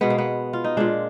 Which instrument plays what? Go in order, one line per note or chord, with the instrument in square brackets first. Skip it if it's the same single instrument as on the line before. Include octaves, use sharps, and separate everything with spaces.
[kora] B2 G#3 B3
A#3
B3
F4
D#4
A#2 G#3 D4